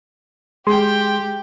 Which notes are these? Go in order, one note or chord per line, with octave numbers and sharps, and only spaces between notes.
G#3 G4 G#4 G5 C6